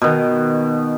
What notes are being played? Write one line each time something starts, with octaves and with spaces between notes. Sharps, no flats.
B2 D#3